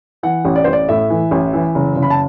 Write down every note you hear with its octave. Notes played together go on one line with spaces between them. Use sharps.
E3 F#5
A1
D5
A1 C5
D5
A2 E5
E3
A1
E3
F#1
F#1
B5
A5